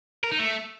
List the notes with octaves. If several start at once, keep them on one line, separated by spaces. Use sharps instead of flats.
A#4
D#4
A3